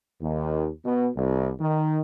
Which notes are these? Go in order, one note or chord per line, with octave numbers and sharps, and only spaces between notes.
D#2
B2
C2
D#3